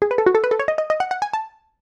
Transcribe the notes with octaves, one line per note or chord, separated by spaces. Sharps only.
G#4
B4
A4
F#4
A4
B4
A4
C#5
D#5
D#5
D#5
F#5
F#5
G#5
A5